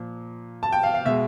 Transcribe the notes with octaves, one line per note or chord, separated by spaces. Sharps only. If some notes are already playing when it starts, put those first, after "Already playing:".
Already playing: A#2 F3
A5
G5
F5
F5
B2 G#3 E5